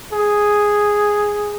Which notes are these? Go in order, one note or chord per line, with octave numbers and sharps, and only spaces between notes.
G#4